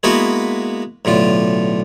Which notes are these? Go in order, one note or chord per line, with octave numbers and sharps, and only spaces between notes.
G#3 A#3 B3 E4 F#4 B4
B1 A2 D3 F4